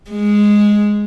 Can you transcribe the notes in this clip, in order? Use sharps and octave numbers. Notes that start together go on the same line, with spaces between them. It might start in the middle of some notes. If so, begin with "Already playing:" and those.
G#3